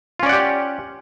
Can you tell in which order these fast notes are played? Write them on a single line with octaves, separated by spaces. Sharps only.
F4 C#4 D5 F#5 G4